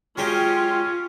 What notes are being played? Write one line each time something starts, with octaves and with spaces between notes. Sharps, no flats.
F#3 G#3 C#4 F4 G4 G5